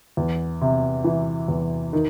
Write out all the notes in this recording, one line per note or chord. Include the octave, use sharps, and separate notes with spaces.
E2
C3
E3
E2
D#3